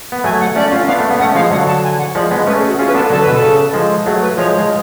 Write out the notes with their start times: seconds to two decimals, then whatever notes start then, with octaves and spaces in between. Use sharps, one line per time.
0.12 B3
0.24 F#3 A3 G#5
0.40 F#5
0.56 A3 C#4 D5
0.72 C#4 F4
0.88 B3 D4 F5
1.00 A3
1.10 B3
1.19 A3 C#4 F#5
1.35 F3 G#3 F5
1.51 D3 F#3 F#5
1.67 A5
1.84 G#5
1.99 F#5
2.15 F3 G#3 D5
2.31 G#3 B3
2.47 A3 C#4 B4
2.58 G#4
2.68 F#4
2.78 C#4 F4 G#4
2.87 B4
2.94 B3 D4 A4
3.10 D3 F#3 A4
3.22 B2 B4
3.34 A4
3.42 C#3
3.74 F3 G#3
4.06 F#3 A3 G#4
4.22 B4
4.37 F3 G#3 C#5
4.58 G#3